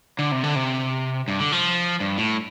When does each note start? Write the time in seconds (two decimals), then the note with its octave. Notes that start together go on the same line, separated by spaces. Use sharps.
0.19 D3
0.32 C3
0.43 D3
0.55 C3
1.28 G2
1.40 D3
1.52 F3
2.00 G2
2.18 A2